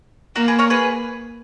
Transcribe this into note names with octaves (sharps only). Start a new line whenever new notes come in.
A#3 F#4 A#4
G#4 B4
A#4 C#5
G#4 B4